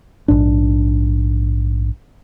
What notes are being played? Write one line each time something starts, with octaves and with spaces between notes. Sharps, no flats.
A#1 G#2 D4